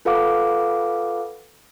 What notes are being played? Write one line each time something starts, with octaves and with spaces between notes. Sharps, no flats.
F4 A4 B4 F5 F#5 D6